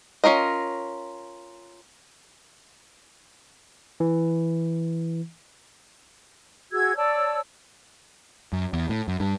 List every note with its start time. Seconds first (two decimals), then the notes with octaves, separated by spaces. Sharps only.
0.24 C#4 F4 A#4 D#5
4.00 E3
6.72 F#4 G#4 E6 G#6
6.96 C#5 D5 A5 E6
8.53 F#2
8.73 E2
8.89 A2
9.08 F#2
9.20 G2